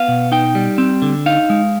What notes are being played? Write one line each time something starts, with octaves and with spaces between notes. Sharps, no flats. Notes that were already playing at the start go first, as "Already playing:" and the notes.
Already playing: B3 F5
B2
D#4 G5
G3
C4
D3
D#4 F5
G#3